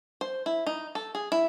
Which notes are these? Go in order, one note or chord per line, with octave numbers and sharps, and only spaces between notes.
C5
E4
D#4
A4
G#4
E4